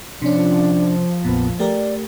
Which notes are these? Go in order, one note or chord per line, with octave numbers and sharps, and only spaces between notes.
C3 F3 C#4 D4
A#1 F2 A#2 B3
A3 G4 A#4 D5